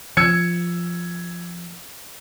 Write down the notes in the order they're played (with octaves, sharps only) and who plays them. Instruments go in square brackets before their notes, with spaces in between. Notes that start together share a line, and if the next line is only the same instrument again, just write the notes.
[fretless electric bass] F3 [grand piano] E6 G#6 C#7